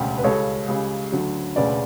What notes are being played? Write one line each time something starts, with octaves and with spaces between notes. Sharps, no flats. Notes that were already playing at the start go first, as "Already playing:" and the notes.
Already playing: E1 D2 C#3 G3 G4
B4
C#2 C#3 G3 A4 C#5
C#2 C#3 G3
D2 D3 F#3
E1 D2 C#3 B4 D5